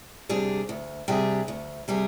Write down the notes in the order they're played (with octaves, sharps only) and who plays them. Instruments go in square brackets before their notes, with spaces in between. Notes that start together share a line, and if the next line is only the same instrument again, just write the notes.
[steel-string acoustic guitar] C3 G3 D4 G#4
D2
C3 G3 D4 G#4
D2
C3 G3 D4 G#4